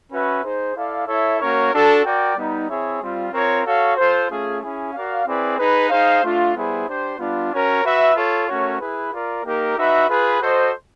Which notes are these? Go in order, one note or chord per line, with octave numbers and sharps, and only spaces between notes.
C#4 F#4 B4 E5
D#4 G#4 C5
E4 A4 D5 F5
E4 A4 C#5 E5
A#3 C#4 F#4 A#4 C#5
D4 F#4 A4
F#4 A#4 D5 G5
G3 B3 D#4
C4 E4 G#4 C#5 E5
G3 C4 F4
C4 F4 A#4 C#5
F#4 A4 C#5 F5
F4 A4 C5
A3 C#4 F4 G#4
C#4 E4 G#4
F#4 A#4 D5 F5
C4 E4 G#4 B4 D5
D#4 G#4 B4
D#4 G#4 C5 F5
A3 D4 F4
G3 B3 E4 G#4 C5
D4 G4 C5
G3 B3 D4 F4
C#4 F#4 A#4 C#5
F#4 B4 E5
F4 A4 C#5
A3 C#4 F#4 A#4 C#5
E4 G#4 B4
F4 A#4 D5
A#3 D#4 G4 A#4
D#4 F#4 B4 E5
F4 G#4 B4
F#4 A4 C5 D#5